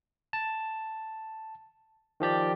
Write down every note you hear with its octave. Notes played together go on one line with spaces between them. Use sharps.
A5
D#3 F3 G4 D5